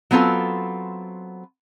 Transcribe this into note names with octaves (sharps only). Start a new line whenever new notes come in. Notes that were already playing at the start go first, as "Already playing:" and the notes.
F#3 B3 C4 F4 A4